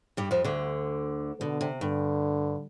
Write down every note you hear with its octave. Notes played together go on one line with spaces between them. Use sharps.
G2 G3
F2 F3
D2 D3
B2 D3
C3
G2 D3